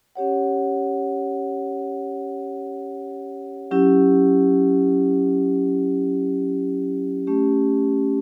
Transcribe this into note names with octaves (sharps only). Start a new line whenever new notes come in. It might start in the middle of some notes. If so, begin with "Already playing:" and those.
C#4 G4 C#5 F#5
F#3 C#4 E4 G4
A3 C#4 G4